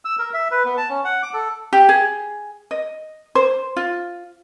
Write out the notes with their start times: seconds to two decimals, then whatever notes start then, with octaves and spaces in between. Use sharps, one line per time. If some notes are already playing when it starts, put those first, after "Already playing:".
0.05 E6
0.19 A#4
0.34 E5
0.51 B4
0.65 B3
0.78 A5
0.89 C#4
1.05 F#5
1.22 D6
1.34 A4
1.73 G4
1.89 G#4
2.71 D#5
3.35 C5
3.77 F4